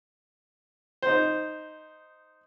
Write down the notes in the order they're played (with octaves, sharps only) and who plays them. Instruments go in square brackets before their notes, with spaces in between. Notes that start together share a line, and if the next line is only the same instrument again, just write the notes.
[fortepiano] D#4 C5